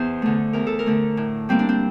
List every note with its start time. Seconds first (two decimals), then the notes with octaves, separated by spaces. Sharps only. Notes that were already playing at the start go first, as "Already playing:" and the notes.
Already playing: E2 C5
0.22 D3 A3
0.53 E2 A#4
0.67 A4
0.79 A#4
0.86 D3 A3
1.17 A2
1.49 G3 A#3 C4
1.59 D4
1.69 C4